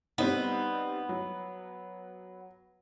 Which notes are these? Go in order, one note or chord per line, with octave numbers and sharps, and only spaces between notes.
G3 B3 C4 D#4
F#3